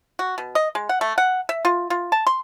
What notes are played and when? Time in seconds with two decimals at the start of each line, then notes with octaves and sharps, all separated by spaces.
0.19 F#4
0.38 B2
0.55 D#5
0.75 G#3
0.89 F#5
1.01 A3
1.18 F#5
1.49 E5
1.65 F4
1.90 F4
2.12 A5
2.27 C6